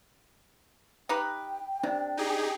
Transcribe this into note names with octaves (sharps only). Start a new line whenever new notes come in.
D#4 G4 B4 G5
C3 D4
D#4 G4 G#4